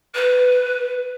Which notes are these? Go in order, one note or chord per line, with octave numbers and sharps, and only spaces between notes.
B4